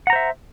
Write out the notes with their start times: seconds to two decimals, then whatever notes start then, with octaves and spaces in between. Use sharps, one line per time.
0.07 F#5
0.10 A#5
0.13 C5
0.16 E5